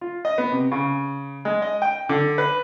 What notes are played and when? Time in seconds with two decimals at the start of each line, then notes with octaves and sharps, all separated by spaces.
0.01 F4
0.25 D#5
0.38 B3
0.52 C3
0.72 C#3
1.45 G#3
1.62 D#5
1.82 G5
2.09 D3
2.38 B4